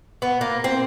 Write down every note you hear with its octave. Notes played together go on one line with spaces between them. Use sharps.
B3
A#3
C4